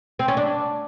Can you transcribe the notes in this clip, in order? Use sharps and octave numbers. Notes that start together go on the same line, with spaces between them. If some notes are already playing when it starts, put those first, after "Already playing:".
C4
C#4
D4